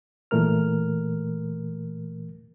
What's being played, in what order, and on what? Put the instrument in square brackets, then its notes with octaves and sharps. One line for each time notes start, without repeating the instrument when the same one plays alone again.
[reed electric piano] A#2 E3 A3 A#4 F6